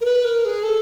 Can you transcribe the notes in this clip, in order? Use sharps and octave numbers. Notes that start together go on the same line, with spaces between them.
A#4
B4
A#4
G#4
A4